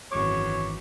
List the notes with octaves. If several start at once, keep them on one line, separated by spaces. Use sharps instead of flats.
G#1 F#2 E3 C#5 C#6 D6